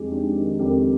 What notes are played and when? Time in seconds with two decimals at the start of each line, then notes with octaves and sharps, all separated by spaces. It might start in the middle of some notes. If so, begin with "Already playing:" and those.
Already playing: F2 G#3 D#4 G4
0.12 D4
0.36 D#3
0.59 F2 G4 A#4